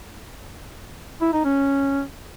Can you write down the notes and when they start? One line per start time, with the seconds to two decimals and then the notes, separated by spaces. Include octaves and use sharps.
1.21 E4
1.33 D#4
1.45 C#4